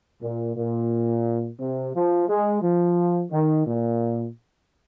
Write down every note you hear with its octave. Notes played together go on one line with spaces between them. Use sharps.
A#2
A#2
C3
F3
G#3
F3
D#3
A#2